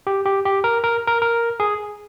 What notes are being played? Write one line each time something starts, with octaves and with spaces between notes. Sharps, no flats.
G4
G4
G4
A#4
A#4
A#4
A#4
G#4